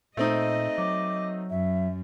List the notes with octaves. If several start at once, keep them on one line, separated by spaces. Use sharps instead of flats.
A#2 A3 C4 D#4 D#5
F#3 D6
F#2 E5